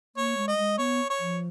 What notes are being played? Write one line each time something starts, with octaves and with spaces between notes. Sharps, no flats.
A#3 C#5
G#3
D#5
G#3
B3 C#5
C#5
F3